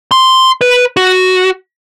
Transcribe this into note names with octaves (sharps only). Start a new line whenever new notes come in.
C6
B4
F#4